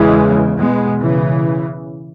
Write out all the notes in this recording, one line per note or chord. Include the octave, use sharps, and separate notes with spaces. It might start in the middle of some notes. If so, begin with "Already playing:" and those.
Already playing: E2 C#3 E3 G#3
E2 B2 G#3 B3
C#3 E3